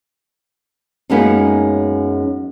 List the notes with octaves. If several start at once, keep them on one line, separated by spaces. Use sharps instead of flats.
F#2 G#3 A#3 B3 C#4 D#4